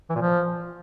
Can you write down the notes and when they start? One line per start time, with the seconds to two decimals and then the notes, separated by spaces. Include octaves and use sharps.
0.10 E3
0.15 A#2
0.21 F3